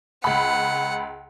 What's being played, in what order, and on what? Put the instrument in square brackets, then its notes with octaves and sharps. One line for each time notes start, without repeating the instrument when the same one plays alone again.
[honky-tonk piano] C#2 B5 [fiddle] F#5